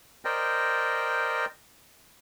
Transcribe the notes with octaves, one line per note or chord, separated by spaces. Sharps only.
A#4 C5 D5 D#5 G5